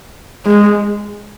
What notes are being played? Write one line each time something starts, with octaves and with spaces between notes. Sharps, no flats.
G#3